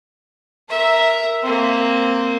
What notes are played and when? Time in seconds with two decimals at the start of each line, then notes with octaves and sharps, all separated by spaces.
0.69 A#4 E5
1.44 A#3 C4